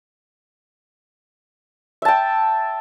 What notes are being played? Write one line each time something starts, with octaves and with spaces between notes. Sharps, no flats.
E5 G5 A5